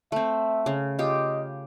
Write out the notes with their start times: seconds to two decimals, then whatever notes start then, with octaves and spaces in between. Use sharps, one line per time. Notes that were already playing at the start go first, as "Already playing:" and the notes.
0.12 A3 C4 E5
0.66 C#3
0.99 F4 G4 D#5